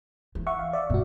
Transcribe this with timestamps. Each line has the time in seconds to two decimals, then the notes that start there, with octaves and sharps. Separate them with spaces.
0.35 E3
0.47 E5 F#5 C#6
0.59 F5
0.73 D5 E5
0.90 G2 B2 F#4